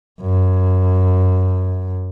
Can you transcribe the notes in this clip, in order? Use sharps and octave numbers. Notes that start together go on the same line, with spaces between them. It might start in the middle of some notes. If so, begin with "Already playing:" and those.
F#2